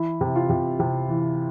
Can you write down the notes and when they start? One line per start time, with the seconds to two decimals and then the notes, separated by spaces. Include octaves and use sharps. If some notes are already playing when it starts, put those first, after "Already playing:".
Already playing: E3 E4
0.21 C3
0.36 F4
0.50 C3
0.80 C3
1.09 E3